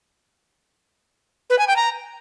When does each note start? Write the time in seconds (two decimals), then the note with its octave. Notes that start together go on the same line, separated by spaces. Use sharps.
1.50 B4
1.59 G#5
1.67 G5
1.76 A#5